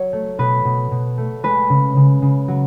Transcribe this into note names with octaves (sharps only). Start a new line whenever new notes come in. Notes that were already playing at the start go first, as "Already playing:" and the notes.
Already playing: F#3 C#5
A3
B2 B4
B2
B2
A3
G#3 B4
C#3
C#3
C#3
F#3